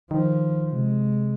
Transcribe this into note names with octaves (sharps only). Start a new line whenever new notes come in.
D#3 F3
C3 G#3